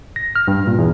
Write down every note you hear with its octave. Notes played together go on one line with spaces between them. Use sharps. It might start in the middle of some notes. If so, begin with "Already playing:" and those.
A#6
F6
G2
A#2
E2